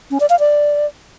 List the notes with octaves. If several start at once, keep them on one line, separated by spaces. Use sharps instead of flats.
C#4
D5
F5
D5